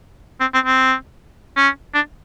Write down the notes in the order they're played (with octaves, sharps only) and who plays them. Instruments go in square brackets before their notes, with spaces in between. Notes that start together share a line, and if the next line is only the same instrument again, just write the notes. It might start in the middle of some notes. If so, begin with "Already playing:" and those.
[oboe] C4
C4
C4
C#4
D4